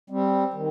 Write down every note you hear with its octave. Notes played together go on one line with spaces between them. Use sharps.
G3 C4
D#3